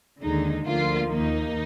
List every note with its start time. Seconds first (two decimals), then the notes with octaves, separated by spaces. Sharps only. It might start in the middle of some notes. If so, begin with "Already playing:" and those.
0.21 D#2 D3 G#3 D#4
0.66 D2 D3 F3 A#3 F4
1.10 D#2 D#3 A#3 D#4